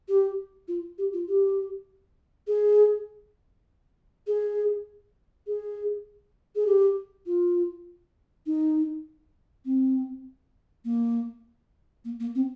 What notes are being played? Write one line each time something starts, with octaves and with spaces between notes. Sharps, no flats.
G4
F4
G4
F4
G4
G#4
G#4
G#4
G#4
G4
F4
D#4
C4
A#3
A#3
A#3
C4